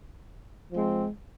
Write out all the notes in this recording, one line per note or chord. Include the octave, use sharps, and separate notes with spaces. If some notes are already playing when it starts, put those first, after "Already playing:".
F3 G#3 C4